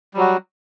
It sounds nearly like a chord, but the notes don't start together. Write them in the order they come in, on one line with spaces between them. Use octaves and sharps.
G3 F#3 F#4